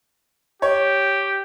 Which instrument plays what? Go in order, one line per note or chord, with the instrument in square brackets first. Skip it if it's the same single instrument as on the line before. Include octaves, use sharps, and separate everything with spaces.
[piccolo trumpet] G4 [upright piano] C#5